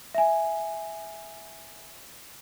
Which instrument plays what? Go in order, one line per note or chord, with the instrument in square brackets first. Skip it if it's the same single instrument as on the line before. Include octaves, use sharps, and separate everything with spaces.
[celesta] E5 G#5